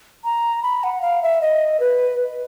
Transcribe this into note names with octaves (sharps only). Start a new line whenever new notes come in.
A#5
B5
F#5
F5
E5
D#5
B4